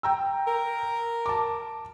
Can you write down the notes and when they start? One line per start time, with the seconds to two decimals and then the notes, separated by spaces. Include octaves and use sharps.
0.03 G5 A#5 E6
0.47 A#4
1.26 A5 D6